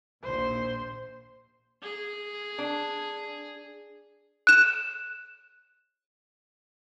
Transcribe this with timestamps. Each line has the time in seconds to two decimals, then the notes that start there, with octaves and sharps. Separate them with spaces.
0.23 A#1 D#2 A#2 C5
1.83 G#4
2.58 D4
4.47 F#6 E7